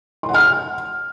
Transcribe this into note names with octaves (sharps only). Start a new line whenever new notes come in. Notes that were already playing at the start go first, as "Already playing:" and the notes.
C6
F#5
F6